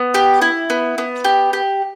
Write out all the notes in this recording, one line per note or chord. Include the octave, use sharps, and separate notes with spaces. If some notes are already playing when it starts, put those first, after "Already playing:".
Already playing: B3
G4
E4
B3
B3
G4
G4